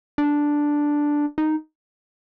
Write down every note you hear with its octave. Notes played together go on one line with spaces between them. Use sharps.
D4
D#4